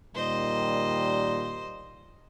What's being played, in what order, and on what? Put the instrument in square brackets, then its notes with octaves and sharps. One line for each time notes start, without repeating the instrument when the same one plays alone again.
[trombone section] A#2 D#3 G3 [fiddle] C5 D#5